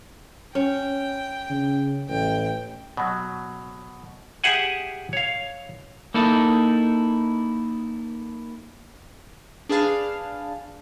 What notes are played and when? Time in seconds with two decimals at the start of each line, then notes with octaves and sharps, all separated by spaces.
0.55 C#4 G5
1.50 C#3
2.09 A1 G5
2.97 B2 F#3
4.44 G4 G#4 E5 F#5 G#5
5.13 C#5 F5
6.14 A#3 D#4 E4 A4
9.69 D4 G#4 B4 F5 A5